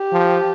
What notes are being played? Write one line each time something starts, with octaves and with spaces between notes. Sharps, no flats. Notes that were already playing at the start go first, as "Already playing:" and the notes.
Already playing: G4
F3